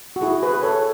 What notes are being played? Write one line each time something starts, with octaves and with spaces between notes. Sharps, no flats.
F#4
E4 G#4
G#4 B4
A4 C#5